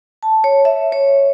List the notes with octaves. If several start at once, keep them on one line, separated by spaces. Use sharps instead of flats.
A5
C#5
E5
C#5